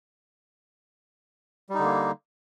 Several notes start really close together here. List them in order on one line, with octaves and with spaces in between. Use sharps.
G3 D#4 D3 A#3